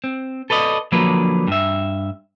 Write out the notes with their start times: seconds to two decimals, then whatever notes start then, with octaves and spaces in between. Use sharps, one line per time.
0.04 C4
0.50 A4 B4 D5 D#5
0.92 D3 F3 F#3 A#3 B4
1.48 G2 E5